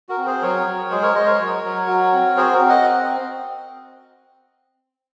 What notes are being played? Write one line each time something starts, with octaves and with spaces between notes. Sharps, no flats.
F#4 A#4
C4
G#4 C5
F#3 A#4 C#5
F#3
G#3 G#4 C5
A#4 C#5
G#3 C5 D#5
A#4 C#5
F#3
F#3
F#4
C4
F#4 G#4 C5
F#4 A#4
C4
D#5 F#5